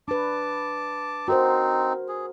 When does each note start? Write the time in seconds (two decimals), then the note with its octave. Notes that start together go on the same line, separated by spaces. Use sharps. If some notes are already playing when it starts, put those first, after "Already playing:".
0.08 D4 B4 A5 D6
1.28 C4 D#4 F#4 A#4 C5
2.09 G#4